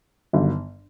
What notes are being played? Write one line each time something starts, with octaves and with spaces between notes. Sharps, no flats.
G1 G2 D#3 F#3